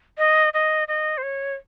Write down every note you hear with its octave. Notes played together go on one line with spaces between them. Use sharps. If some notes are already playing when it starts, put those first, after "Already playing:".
D#5
D#5
D#5
C5
C#5